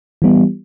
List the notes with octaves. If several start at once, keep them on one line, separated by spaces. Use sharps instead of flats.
E3 G3 B3